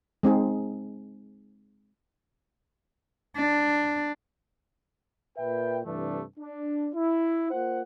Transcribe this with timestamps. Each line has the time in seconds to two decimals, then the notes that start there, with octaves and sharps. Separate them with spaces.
0.23 G#3 C4 D#4 G#4
3.37 D4
5.37 A#2 B4 E5 G5
5.85 G2 C3 E3 A3 D4
6.38 D4
6.95 E4
7.51 A#3 F4 C5 F#5